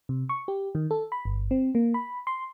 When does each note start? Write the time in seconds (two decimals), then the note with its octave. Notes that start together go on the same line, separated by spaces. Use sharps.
0.09 C3
0.29 C#6
0.48 G4
0.75 D#3
0.91 A4
1.12 B5
1.25 G1
1.51 C4
1.75 A#3
1.94 B5
2.27 C6